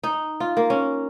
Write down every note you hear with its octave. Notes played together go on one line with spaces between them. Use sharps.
D#4
F4
A#3
C#4